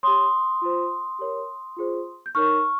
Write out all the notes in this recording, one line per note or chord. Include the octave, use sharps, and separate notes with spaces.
G4 C#5 C6 D#6
F4 C5
G4 A#4 C#5
F4 G#4 C5
G6
D#4 A#4 C#5 C#6 F6